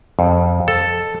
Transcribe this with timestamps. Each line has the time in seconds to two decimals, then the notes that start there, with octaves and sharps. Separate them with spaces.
0.19 F2
0.68 A4